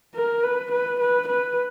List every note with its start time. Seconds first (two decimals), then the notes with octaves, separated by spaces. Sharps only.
0.15 A#4
0.44 B4
0.72 B4
1.00 B4
1.28 B4